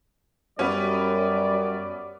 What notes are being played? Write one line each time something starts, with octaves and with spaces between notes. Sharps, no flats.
F#2 G3 B3 C#4 D5